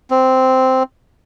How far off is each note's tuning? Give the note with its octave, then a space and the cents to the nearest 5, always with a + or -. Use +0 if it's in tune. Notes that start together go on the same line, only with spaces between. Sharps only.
C4 -5